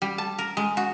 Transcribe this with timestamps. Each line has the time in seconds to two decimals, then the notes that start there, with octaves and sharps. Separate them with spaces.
0.02 G3
0.18 A5
0.39 A#4
0.57 G#3
0.77 F#4